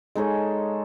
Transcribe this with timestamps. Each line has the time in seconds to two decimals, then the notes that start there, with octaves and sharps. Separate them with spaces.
0.15 G#3 D#4 A4 C#5